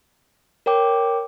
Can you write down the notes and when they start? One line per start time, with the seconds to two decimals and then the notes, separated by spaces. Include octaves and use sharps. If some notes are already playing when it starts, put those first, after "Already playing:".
0.66 A#4 C#5 G5 D6